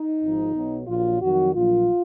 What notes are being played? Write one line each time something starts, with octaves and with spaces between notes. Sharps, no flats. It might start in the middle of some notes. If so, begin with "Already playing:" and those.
Already playing: D#4
G#1 G#2 F3
B1 B2 F#3
A#1 A#2 F#3 F4
F2 D#3 F#3 F#4
A#1 A#2 F#3 F4